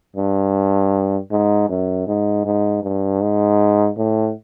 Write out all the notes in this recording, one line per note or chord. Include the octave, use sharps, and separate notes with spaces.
G2
G#2
F#2
G#2
G#2
G2
G#2
A2